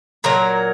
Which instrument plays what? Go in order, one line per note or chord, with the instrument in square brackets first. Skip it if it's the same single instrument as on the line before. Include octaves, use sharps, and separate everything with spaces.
[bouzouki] A#2 F#3 A#4